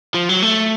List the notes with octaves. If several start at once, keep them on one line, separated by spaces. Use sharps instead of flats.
F3
F#3
A3